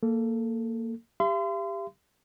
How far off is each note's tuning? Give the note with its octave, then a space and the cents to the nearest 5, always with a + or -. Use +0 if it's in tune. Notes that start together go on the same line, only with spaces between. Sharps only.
A#3 -20 A4 +0
G4 +15 E5 +45 C6 -35